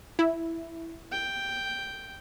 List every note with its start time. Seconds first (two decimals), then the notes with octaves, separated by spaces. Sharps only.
0.19 E4
1.12 G5